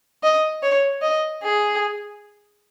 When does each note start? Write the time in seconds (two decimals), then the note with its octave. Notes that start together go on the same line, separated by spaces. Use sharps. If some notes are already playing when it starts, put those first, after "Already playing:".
0.24 D#5
0.63 C#5
1.02 D#5
1.42 G#4